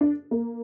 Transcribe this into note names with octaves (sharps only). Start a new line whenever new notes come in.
D4
A#3